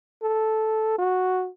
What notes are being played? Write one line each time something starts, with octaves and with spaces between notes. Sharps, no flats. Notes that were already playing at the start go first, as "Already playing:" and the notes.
A4
F#4